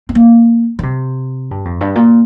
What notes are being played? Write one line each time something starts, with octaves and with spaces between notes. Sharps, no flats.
C4
A#3
D#3
C3
G2
F2
G2
A#2